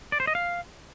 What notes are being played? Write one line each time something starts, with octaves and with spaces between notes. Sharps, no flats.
D5
C5
D#5
F5